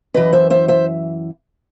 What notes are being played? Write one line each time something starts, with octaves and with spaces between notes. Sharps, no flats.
F#2 E3 B4 D#5
C5 E5
C5 E5
C5 E5